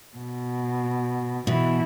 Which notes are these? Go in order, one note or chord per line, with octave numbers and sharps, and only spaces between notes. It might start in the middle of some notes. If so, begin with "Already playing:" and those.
B2
B2 E3 E4